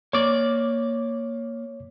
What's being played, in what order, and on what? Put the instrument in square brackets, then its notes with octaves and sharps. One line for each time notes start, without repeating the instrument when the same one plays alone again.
[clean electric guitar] A#3 D5 [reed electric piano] C#5 D6